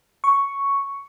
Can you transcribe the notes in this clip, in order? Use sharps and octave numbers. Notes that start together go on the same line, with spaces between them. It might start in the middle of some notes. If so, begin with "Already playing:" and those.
C#6